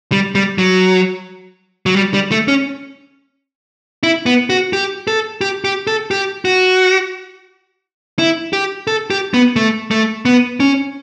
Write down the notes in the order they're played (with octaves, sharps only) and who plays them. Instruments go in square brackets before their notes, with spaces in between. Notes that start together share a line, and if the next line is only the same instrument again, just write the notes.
[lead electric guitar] G3
G3
F#3
F#3
G3
G3
A3
C#4
E4
B3
F#4
G4
A4
G4
G4
A4
G4
F#4
E4
G4
A4
G4
B3
A3
A3
B3
C#4